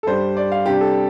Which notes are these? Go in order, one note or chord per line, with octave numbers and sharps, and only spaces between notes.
A4
G2 G3 D4 C5
D5
F5
C3 G3 D4 G4
A4